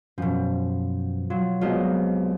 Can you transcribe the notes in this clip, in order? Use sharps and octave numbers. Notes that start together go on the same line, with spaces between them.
F#2 B2 F3
F#3 F4
C2 F#3 G#3 B3 F4 D#5